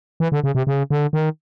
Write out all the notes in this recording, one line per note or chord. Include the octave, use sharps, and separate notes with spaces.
E3
D3
C#3
C3
C#3
D3
D#3